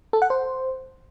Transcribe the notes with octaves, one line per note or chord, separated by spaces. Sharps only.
A4
F#5
C5